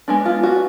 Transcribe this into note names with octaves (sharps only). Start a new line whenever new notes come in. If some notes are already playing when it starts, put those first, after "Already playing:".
G#3 B3 D4
F4
F#4